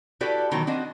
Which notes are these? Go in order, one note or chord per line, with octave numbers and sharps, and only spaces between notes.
E4 F#4 G4 A4 B4 D5
B2 D#3 E3 F#3 B3
C4 D4 F#4 D#5